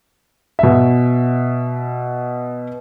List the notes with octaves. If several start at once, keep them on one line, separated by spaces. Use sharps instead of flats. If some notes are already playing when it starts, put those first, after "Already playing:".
B2 E5